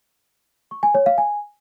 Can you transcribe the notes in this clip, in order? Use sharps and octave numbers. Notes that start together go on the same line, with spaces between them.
C#6
G#5
C#5
F5
G#5